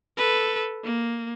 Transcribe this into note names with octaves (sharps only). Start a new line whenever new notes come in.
A4 B4
A#3